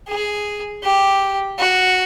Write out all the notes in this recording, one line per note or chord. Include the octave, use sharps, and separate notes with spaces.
G#4
G4
F#4